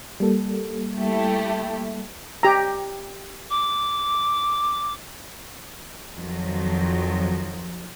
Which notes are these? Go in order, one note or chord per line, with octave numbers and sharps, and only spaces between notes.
G3 A#3 A4
A3 E4 G4
G4 A#5
D6
F2 D#3 F3 F#3